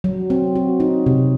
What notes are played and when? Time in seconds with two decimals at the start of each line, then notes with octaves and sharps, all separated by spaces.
0.04 F#3
0.30 C4
0.56 F#4
0.80 D#4
1.06 C3